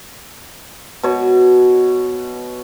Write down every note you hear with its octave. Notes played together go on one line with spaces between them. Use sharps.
B2 C#5